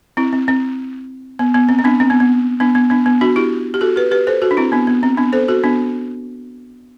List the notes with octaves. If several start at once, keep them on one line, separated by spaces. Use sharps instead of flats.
C4 E4
C4
C4
B3
B3
C4
C4
B3 D4
C4
B3
B3
B3 D4
B3
B3 D4
B3
D4 F#4
E4 G4
G4
F#4 A4
G4 B4
G4 B4
A4 C5
F#4 A4
D4
C4 E4
B3 D4
B3
C4
B3 D4
A4 C5
F#4 A4
B3 D4